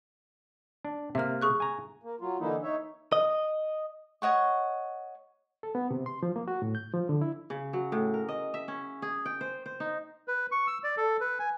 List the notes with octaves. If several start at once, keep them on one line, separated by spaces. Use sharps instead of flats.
D4
C3 A#3 E5 F6
G#4 C#6 F#6
G#5 A#5
A#3
F#3 F4
D3 E3 A#3 D#4 E4
D#4 C#5 E5
D#5
C#5 D#5 F#5 C#6
A4
B3
C3
C6
F3
A#3
F#4
A2
G6
F3
D3
E4
C#3
F#3
A2
A#4
D#5
E5
C#4
G#4
G5
C5
C5
D#4
B4
C#6
E6
D5
A4
B4
G#5